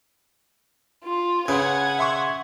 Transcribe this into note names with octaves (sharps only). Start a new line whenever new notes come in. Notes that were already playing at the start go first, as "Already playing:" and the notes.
F4
C#3 B4 F#5 G#5 G#6
E5 C6 C#6